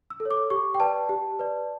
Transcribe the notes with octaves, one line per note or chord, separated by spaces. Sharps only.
E6
A4
C#5
D6
G4 C#6
G5
B4 D5 A5
G4
B4 D5